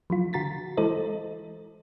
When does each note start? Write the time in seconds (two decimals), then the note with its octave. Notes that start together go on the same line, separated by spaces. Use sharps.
0.10 F3 F#3 F4
0.33 D3 F#4 A#5 A6 B6
0.77 E3 G#3 E4 A4 C5 D#5